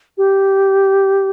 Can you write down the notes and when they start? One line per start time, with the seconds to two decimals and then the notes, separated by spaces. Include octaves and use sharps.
0.18 G4